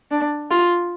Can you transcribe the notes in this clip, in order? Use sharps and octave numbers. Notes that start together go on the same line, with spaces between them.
D4
F4